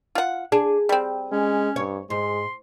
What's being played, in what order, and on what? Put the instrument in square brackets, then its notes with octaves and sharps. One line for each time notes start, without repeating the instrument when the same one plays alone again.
[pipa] F4 F#5
[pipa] D4 [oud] G#4
[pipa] G3 C4
[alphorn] G#3 [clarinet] C#4
[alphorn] G2 [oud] C#5
[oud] G#2 [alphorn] G#3 [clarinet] C6